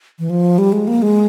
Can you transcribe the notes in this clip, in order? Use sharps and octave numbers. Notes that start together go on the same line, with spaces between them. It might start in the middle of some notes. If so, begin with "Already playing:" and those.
E3
F3
G3
G#3
A#3
G#3